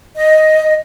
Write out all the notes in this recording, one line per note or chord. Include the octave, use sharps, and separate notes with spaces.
D#5